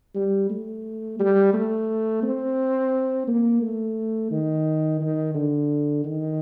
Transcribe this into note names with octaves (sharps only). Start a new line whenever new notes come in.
G3
A3
G3
A3
C4
A#3
A3
D#3
D#3
D3
D#3